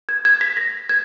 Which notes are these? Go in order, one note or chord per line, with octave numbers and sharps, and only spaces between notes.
G#6
G#6
B6
A#6
G#6